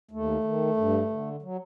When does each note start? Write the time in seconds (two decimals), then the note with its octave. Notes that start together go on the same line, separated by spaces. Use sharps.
0.11 D#2 A3
0.44 D#3
0.77 G2
1.10 D3
1.42 F#3